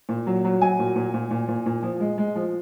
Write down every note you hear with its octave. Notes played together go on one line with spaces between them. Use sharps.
A#2
F#3
F#3
F#3 G#5
A#2
A#2
A#2
A#2
A#2
A#2
F3
G#3
G#3
F3